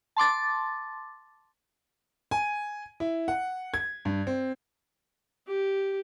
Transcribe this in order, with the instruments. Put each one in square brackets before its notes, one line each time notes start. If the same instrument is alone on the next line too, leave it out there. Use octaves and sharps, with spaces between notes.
[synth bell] A5 C6 D6 A6
[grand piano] G#5
E4
F#5
G#6
G2
C4
[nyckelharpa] G4